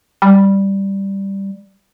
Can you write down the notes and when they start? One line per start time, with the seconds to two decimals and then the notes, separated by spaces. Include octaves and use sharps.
0.22 G3